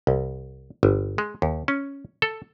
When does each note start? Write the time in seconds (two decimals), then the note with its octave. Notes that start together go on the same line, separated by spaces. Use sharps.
0.07 C2
0.83 G1
1.18 G#3
1.42 D#2
1.68 C#4
2.22 A4